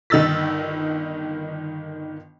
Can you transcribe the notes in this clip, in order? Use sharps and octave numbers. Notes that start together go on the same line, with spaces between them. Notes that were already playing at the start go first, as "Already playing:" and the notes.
G1 D#3 D#5 E6 A6 B6